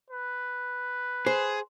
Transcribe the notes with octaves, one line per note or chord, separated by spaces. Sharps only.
B4
G#4 C5